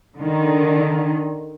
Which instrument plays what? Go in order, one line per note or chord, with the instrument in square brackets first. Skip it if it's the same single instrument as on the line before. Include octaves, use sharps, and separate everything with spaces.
[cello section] D3 D#3